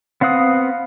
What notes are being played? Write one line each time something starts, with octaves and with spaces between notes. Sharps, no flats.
B3 C4 F5 F#5 D#6